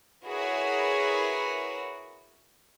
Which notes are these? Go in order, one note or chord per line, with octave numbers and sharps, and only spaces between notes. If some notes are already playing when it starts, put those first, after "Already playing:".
E4 F#4 G#4 A#4 B4 C#5